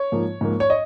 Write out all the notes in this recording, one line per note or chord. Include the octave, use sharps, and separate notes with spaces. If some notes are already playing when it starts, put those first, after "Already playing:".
Already playing: C#5
G#2 F3 A#3
G#2 F3 A#3
C#5
D#5